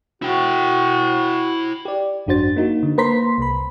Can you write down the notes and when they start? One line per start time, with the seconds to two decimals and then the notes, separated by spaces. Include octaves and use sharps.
0.22 E4 F#4 G5
1.85 G4 D5
2.27 G#1 F#2 D4 F#4 C5 A6
2.56 A#3 D#4 F#4
2.83 D3
2.98 A#3 B4 C5 A#5 C6 B6
3.38 C2 B5